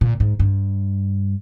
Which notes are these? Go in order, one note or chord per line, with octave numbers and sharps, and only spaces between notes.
A#2
G#2
G2